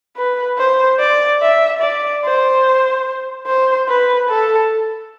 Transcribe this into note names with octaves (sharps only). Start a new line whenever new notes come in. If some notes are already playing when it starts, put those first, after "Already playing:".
B4
C5
D5
E5
D5
C5
C5
B4
A4